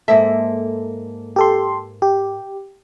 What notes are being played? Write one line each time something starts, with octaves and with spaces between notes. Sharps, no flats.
G#2 A#3 A4 E5
G4 A4 C6
G4